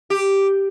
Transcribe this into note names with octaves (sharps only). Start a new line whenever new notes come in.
G4